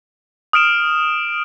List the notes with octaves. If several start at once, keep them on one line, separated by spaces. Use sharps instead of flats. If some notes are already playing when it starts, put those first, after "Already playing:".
D#6 F6 D7 E7